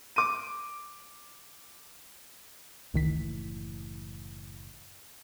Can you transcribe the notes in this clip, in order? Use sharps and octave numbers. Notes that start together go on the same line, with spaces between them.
D6 D#7
F#1 C#2 A2 D#3 E3 B6